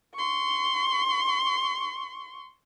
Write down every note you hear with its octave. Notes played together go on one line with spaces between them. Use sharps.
C6 C#6